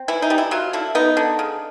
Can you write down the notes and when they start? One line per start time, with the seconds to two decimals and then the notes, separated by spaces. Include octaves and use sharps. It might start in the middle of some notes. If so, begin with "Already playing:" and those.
Already playing: C4
0.08 E3 E4
0.22 D#4
0.30 G3
0.38 E4
0.51 F#3 F4
0.73 D3 E4
0.95 B3 D#4
1.17 D3
1.39 C#3